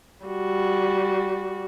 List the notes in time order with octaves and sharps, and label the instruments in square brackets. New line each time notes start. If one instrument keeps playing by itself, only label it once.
[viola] G3 F#4